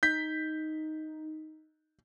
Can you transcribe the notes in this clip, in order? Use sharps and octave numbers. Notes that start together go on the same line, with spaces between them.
D#4 G6 B6